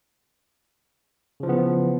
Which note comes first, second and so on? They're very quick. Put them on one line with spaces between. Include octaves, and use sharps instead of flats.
C#3 F3 E3 B3